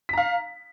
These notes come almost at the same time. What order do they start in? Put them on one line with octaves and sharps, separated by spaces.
B6 A#5 F5